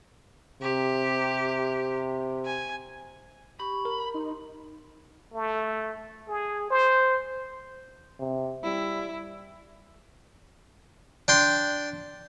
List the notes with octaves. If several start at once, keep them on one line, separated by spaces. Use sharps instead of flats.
C3 G4
G#5
G4 B5 C#6
A#4
D#4 C6
A3
G#4
C5
C3
G3 E4
D4 G5 C6